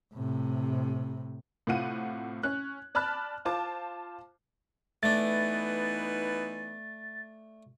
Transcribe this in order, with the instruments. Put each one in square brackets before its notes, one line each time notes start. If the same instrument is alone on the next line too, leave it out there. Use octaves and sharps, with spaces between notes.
[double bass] A2 C3
[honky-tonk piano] A2 C3 F4 F#5 D#7
C#4 F#6
D5 A5 B5 F6 F#6
F4 C5 A5 D6
[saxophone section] E3 B3 D#4 [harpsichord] A3 D4 [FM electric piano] A6